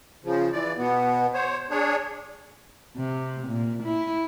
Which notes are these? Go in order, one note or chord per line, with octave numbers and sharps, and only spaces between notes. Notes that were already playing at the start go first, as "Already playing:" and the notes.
C#3 F3
E3 D5
B2 B3
C5 C#5
D4 G#4 C#5
C3
A#2
E4